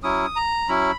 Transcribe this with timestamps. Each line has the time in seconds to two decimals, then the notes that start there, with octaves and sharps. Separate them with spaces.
0.03 F#3 C#4 E4 D#6
0.36 A#5
0.68 F#3 C#4 E4 B5